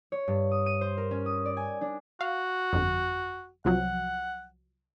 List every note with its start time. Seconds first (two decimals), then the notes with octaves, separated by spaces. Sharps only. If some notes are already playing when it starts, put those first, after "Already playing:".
0.12 C#5
0.28 G2
0.51 D#6
0.66 D#7
0.81 C5
0.97 A#4
1.11 C#4
1.26 D#6
1.46 D5
1.57 G#5
1.81 D4
2.21 F#4 F5
2.73 G1 F2
3.65 C2 F3 F#3 F#5